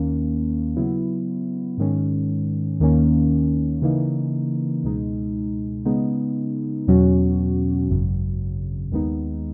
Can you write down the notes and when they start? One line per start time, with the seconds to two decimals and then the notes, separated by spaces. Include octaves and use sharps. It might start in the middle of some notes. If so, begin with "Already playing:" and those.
Already playing: D#2 D#3 A#3 C#4
0.76 C#3 F#3 B3 E4
1.78 G#2 D#3 G#3 C#4
2.80 D#2 D#3 A#3 C#4
3.82 C#3 E3 A#3 D#4
4.83 C#2 B2 G#3 D#4
5.85 C#3 G#3 B3 D#4
6.88 E2 B2 F#3 C#4 F#4
7.89 G#1 F#2 C#3 F#3
8.92 D#2 D#3 G#3 B3 D#4